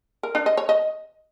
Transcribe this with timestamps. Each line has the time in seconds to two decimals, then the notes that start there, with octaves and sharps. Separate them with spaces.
0.23 A#4
0.35 D4
0.46 D#5
0.57 C#5
0.69 D#5